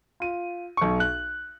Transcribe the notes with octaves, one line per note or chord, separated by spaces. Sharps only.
F4 D#7
B1 C#6
F#6